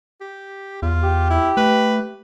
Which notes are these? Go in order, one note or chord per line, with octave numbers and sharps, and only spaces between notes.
G4
E2 F4
G4
E4
A3 B4